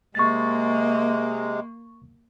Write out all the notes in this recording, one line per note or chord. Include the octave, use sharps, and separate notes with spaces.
C3 G#3 A#3 C#6 A6